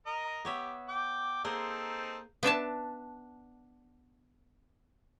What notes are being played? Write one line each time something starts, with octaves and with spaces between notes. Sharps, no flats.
A#4 D#5 A#5
B3 G4 C#5 E5
G5 D6
A#3 C4 D#4 G#4 A4 C5
B3 D4 E5 A5